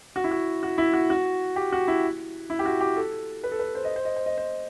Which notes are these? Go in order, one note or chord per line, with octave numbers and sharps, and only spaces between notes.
F#4
E4
F#4
F#4
E4
F#4
F#4
G4
F#4
E4
E4
G4
F#4
G4
A4
B4
A4
B4
C5
D#5
C5
D#5
C5
D#5
C5